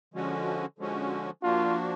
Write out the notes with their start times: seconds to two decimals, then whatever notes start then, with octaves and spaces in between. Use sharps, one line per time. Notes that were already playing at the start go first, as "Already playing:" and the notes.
0.14 D3 F3 G#3 C#4 F#4
0.79 D3 F3 G#3 C#4 F#4
1.43 F3 A#3 D4 F4 F#4